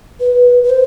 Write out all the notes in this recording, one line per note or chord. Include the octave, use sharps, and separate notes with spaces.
B4
B4
C5